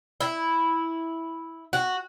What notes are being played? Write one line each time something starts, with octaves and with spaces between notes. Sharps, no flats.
E4
F#4